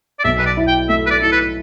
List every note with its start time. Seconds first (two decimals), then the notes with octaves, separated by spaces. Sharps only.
0.19 D5
0.24 B1 E5
0.39 B4
0.46 D5
0.57 E4
0.67 G5
0.89 A3 E5
1.07 B4
1.10 D5
1.22 E4 A4
1.32 B4